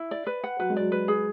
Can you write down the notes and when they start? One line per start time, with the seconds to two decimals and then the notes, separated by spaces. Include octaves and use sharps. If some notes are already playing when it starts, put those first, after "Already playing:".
Already playing: E4
0.11 D5
0.27 B4
0.44 F#5
0.59 F#3 B4
0.70 G#3
0.77 F#3 D5
0.92 B4
1.08 G#4